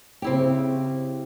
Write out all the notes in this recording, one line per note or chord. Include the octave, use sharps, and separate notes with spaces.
C#3 C4 E4 G4